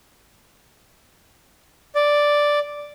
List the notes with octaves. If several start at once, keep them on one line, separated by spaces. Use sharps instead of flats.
D5